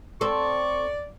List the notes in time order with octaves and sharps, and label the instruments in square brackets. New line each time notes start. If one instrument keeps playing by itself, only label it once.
[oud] C4 A4 [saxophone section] D5 [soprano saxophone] C#6